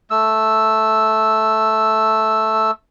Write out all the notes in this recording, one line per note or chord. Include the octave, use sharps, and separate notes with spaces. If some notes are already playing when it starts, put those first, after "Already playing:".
A3 E6